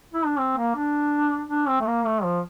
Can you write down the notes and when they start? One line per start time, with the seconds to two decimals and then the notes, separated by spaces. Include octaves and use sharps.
0.14 E4
0.26 D4
0.39 C4
0.57 A#3
0.76 D4
1.50 D4
1.68 C4
1.81 A3
1.87 A#3
2.06 A3
2.24 F3